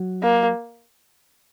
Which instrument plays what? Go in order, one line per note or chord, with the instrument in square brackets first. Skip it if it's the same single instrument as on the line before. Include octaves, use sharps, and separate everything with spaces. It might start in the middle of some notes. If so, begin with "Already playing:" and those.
Already playing: [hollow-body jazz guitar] F#3
[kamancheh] A#3